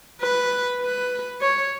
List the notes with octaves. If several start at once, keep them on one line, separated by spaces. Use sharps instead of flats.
B4
B4
C#5